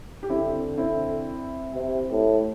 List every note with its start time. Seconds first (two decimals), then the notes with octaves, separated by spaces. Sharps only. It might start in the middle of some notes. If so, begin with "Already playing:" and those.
0.23 G4
0.29 D3 C4 E4
0.78 C4 E4
1.74 C3
2.11 A2